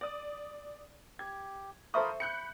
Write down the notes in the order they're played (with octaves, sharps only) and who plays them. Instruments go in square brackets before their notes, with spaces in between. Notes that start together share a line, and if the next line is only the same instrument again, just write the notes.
[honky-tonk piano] D5 D#6
[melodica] G4 [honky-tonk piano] G#6
[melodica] F4 A#4 B5 [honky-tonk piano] A4 C5 D#6 [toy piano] E5 C#6
[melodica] B5 [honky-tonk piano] F#6 G6 C#7